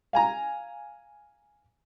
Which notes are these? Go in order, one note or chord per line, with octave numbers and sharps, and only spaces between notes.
F5 G#5 A#5